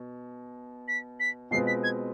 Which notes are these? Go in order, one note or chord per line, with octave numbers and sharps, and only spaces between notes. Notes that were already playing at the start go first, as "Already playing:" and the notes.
Already playing: B2
B6
B6
B2 G#3 C4 F4 B4 C7
B6
G#6